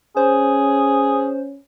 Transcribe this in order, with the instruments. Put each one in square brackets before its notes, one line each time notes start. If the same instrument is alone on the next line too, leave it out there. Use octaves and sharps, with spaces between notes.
[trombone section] C#4 [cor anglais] G#4 [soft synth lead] C5